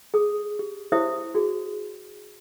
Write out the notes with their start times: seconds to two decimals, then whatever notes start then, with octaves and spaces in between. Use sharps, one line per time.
0.14 G#4 D#6
0.59 G4
0.92 E4 G4 C5 C#5 E5 D#6
1.35 F#4 G#4